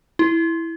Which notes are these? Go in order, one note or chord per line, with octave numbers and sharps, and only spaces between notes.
E4